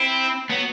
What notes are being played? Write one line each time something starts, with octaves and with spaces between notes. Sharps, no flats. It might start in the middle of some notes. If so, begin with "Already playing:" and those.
Already playing: C4 E4
F#3 B3